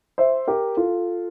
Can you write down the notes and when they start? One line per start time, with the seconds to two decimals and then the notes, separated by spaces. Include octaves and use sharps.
0.18 C5 E5
0.47 G4 A#4
0.77 F4 A4